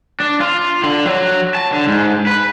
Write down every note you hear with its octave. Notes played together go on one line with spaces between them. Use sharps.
D4
F4
D3
F#3
A5
D3
G#2
B4